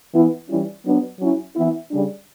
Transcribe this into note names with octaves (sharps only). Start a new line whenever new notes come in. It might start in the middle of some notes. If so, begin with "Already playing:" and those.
E3 B3 E4
E3 G3 C#4 E4
F#3 B3 D4
F#3 C#4 E4
E3 B3 E4
C#3 G3 D4